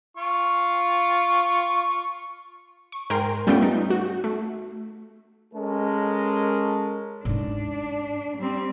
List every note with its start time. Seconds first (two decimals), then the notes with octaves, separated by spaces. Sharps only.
0.17 F4 C#6
2.92 C#6
3.10 G#2 A#4 G5 G#5 C6
3.47 G3 A3 B3 C#4 F4 G5
3.62 D#4
3.90 F#4
4.24 A3
5.54 G#3 C#4 A4 A#4
7.25 G#2 C#4 D4
8.38 G3 C4